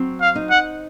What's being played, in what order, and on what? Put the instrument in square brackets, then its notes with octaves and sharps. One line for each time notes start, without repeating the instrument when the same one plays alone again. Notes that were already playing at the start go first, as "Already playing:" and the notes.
Already playing: [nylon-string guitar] F#3 C4
[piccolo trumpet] F5
[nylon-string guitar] D#4
[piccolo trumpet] F#5